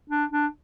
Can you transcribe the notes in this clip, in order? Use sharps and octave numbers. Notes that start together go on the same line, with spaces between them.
D4
D4